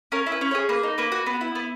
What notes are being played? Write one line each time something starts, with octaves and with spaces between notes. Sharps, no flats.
C#4 A#4
E4
B4
C#4
C#5
G#4
A#3 B4
D#4
A#3 B4
F#4
B3
E4
B3